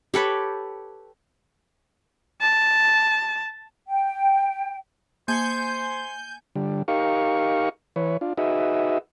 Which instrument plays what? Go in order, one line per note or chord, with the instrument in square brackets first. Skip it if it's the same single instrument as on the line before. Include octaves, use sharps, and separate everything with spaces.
[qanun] G4 A4 B4 C#5
[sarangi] A5
[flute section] G5
[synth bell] A#3 G#6 C#7 [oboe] C5 [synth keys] G#5 G6
[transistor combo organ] D3 G3
D#4 G4 A#4 F5 C#6
E3 B4 C#5
D4 F4
D#4 F#4 G#4 B4 D#5 E5